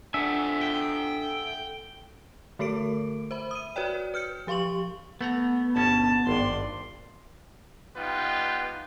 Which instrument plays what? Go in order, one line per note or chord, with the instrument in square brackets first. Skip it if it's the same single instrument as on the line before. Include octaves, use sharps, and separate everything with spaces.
[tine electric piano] D4 [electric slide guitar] A4 F#5 G#5 [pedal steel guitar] E5
[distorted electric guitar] G5
[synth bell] D3 A3 A4 A#4 D6 D7
C5 E5 B5
D#6 D#7
F#4 B4 C#5 D5 G5
B4 F6 G6 C#7
F3 G4 F5 C6 C#6 F#7
[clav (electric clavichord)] A3 F#5 A#5 [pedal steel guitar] B3
[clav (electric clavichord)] G1 B2 C#4 [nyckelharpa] A5
[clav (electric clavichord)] G#1 G2 [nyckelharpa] D5 C6
[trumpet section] G3 B3 D#4 F4 B4 G5